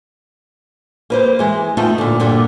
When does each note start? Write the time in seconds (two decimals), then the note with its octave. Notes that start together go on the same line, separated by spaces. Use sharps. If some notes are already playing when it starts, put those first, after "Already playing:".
1.10 A#3 B4 C5
1.39 E3 G#3
1.77 A3 B3 D#4 F4 G5 A5
1.98 A#2 D3
2.20 G2 A#2 D3